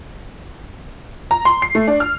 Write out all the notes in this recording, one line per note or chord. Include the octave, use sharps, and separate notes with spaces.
A#5
C6
C7
A3
D4
F6